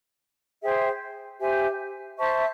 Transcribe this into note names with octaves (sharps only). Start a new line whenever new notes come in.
G#4 C5 E5 G5
G4 C5 E5 G#5
C5 E5 A5 C#6